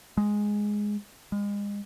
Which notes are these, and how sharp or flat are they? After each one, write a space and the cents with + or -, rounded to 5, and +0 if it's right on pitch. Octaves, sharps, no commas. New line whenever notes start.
G#3 +0
G#3 -35